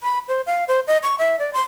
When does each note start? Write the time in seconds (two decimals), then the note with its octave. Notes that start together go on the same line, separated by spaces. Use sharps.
0.03 B5
0.28 C5
0.46 F5
0.68 C5
0.87 D#5
1.03 C#6
1.19 E5
1.39 D5
1.53 C6